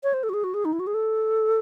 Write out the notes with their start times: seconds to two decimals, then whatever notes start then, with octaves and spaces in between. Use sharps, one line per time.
0.03 C#5
0.14 C5
0.23 A4
0.29 F#4
0.34 G#4
0.44 F#4
0.54 G#4
0.65 D#4
0.73 E4
0.80 F#4
0.87 G#4
0.94 A4